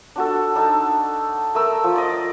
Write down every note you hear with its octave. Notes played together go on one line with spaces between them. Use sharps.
D4 F#4 A4
D4 D#4 A4
A3 A#4 E6
F3
D5 D#5 D6